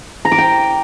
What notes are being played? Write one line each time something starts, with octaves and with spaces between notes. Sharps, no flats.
A#5
D6
G5